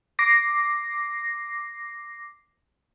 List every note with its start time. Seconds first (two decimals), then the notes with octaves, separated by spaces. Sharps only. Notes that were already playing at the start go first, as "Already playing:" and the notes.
0.19 D6 A#6 C7